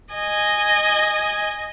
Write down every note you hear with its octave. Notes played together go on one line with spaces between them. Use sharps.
D#5 G#5